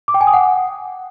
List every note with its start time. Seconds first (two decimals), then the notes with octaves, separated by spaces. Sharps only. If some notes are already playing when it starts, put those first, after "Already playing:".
0.08 D6
0.14 G5
0.21 G#5
0.27 D#6
0.33 F#5